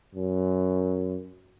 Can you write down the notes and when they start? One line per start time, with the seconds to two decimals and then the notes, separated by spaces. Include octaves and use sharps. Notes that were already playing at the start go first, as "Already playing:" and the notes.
0.15 F#2